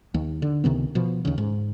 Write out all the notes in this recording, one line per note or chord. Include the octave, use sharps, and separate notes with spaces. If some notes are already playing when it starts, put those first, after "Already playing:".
D#2
D3
C#2 C3 D#3 B3
B2 F3
D#2 C#3
G#2